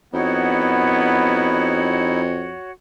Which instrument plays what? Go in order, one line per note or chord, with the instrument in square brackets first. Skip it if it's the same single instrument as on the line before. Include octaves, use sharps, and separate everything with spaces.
[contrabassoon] F2 [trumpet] B3 [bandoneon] D#4 E4 [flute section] F#4 C#5 F#5